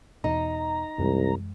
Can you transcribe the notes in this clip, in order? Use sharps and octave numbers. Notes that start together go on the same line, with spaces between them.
E2 B2 D#4 A#5
C2 F#2 E3 G#3